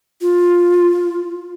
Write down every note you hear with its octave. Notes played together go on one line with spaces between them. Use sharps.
F4